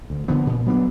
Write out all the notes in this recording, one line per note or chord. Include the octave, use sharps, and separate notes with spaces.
D2
D3 F3 B3
A#2
F#3 B3 D4